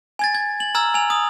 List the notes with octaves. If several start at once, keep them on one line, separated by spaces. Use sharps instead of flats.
G#5 G#6 A6
G#6
F#7
A#5 E6 F6 G#6
G#5 F7
D#6